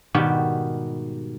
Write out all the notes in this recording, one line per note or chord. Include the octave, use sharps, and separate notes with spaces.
G#2 B2 D#3 G3 F#4 G4